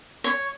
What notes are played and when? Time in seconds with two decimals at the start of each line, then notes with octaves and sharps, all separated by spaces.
0.24 C#5